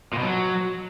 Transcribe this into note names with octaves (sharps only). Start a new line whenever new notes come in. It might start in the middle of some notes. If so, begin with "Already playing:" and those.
A#2
B2
F#3